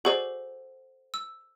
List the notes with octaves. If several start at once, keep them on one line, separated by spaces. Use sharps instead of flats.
F#4 G#4 A4 C5 D5
E6